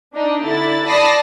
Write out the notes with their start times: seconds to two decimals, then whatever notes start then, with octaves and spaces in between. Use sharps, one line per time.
0.13 D4 D#4
0.43 D3 E4 A6
0.85 D5 A5 B5 D#6 A#6 C7